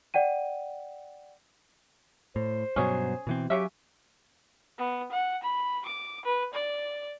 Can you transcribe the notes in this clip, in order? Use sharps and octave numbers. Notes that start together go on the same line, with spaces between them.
D5 F#5 G5 D#7
A2 C5
G2 B2 F#3 C#4 G#4
B2 E3 C4
C#3 F#3 C#4 G4 E5
B3
F#5
B5
D6
B4
D5